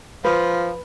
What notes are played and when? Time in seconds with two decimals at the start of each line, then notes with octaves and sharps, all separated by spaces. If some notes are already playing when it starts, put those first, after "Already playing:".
0.25 F3 B4